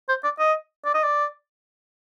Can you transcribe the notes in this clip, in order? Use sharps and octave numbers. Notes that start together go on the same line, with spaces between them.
C5
D5
D#5
D5
D#5
D5